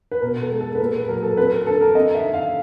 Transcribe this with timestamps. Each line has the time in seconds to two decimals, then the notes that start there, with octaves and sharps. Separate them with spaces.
0.11 B4
0.22 B2 A#4
0.41 A4
0.51 G#3
0.61 A4
0.75 B4
0.80 A#2 A#4
0.95 B4
1.09 F#3 A#4
1.23 A4
1.37 C4 B4
1.52 A#4
1.67 D3 A4
1.81 A#4
1.95 C4 D#5
2.15 E5
2.24 D#3
2.34 F5